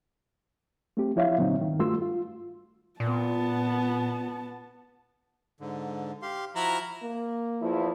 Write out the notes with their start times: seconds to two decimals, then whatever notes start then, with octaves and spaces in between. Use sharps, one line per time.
0.97 A3 C4 G4
1.16 F3 E4 C#5 E5 F5
1.37 G2 A#2 D3 F#3 C4 D#4
1.61 G2 D#3
1.80 G2 A3 F4 F#4 C6 E6
2.02 F4
3.00 A#2 B3 A5
5.61 G#2 D3
6.22 G4 F5 C6
6.55 F3 E4 F#4 A#5 F6
7.03 A#3
7.61 E2 F3 E4